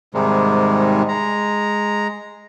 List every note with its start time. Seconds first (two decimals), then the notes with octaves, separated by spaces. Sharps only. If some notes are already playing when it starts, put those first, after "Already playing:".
0.14 G#2 C3 D#3 G3 G#3
1.08 G#3 A#5